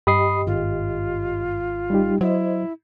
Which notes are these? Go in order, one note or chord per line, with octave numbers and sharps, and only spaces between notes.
G2 G4 D#5 B5 D#6 C7
G#1 F4
G3 D#4 G4
F#3 E4 C5 D#5